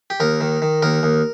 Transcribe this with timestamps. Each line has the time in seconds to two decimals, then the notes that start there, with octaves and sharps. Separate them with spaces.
0.10 G4
0.20 D#2 A#4
0.41 D#3
0.62 D#3
0.82 D#2 A#4
1.03 D#2